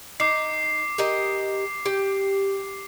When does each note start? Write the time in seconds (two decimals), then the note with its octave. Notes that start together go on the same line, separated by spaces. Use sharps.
0.20 D#4 D6 C7
0.98 G4 A#4 D#5
1.85 G4